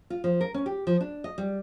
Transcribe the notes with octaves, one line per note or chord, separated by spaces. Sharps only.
F4
F3
A#4
C#4
G4
F3
D4
D#5
G3